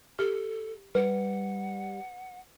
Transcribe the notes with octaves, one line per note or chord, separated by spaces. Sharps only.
G4 A4
G3 B4 F#5